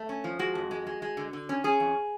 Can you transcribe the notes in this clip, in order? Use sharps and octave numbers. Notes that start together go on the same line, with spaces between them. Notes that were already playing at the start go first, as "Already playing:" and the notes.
Already playing: A3
C#4
F3
G#3 F#4
F2
G#3
G#3
G#3
D3
D3
C#4
C#4 G#4
F2